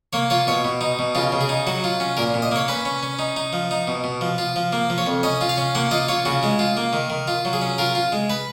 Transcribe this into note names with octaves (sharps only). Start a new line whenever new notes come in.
A#3 C#5
F4 C#5
B2 C#5
B2
D#4
B2
C#3 F4
C#3
G#4
D#4
F#3 F#4
F4
C#4
A#2 A#4
A#2
D#5
A#3 C#5
C#4 B4
C#4
C#4
D#4
D#4
F3
D#4
B2
B2
F3
F4
F3
A#3
F3
C#5
F2
C#4 D#5
F4
F5
C#4
A#3 F#5
F4 D#5
F4 C#5
C#3 F#4
G#3
F4
A#3
D#3
D#3
F4
F#3
G#4
C#4
F4 A#4
F4
G#3
B4